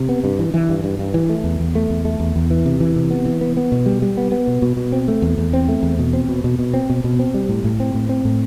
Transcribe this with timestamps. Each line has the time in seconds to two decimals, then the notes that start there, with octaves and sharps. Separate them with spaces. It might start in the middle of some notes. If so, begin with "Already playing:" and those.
Already playing: C3
0.09 B3
0.24 G2
0.39 E3
0.54 E3
0.69 G2
0.84 G2
0.99 G2
1.14 E3
1.29 A3
1.44 E2
1.60 E2
1.75 A3
1.90 E2
2.05 A3
2.20 E2
2.36 E2
2.50 E3
2.66 C3
2.80 E3
2.96 C3
3.10 B3
3.25 E3
3.41 B3
3.57 B3
3.72 B2
3.86 G3
4.02 G3
4.17 B3
4.32 B3
4.47 B2
4.62 B2
4.77 B2
4.92 C4
5.08 A3
5.22 E2
5.38 E2
5.53 C4
5.69 A3
5.83 E2
5.99 B2
6.13 C4
6.29 B2
6.44 B2
6.59 B2
6.74 C4
6.90 B2
7.04 B2
7.19 C4
7.34 G3
7.49 A2
7.64 A2
7.80 C4
7.94 A2
8.09 C4
8.25 A2